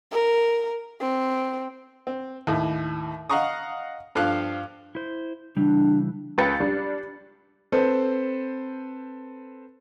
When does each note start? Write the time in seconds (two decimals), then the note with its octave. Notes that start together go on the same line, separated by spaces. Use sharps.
0.12 A#4
1.01 C4
2.07 C4
2.47 D#2 A2
3.30 D#5 F5 F#5 A#5 C#6 D#6
4.15 G2 F3 A4 F5 F#6
4.95 E4 C5
5.57 C#3 E3 G3 D4
6.38 C#2 B4 G5 A6 C#7
6.60 G3 D4
7.72 C4 A4 B4 C5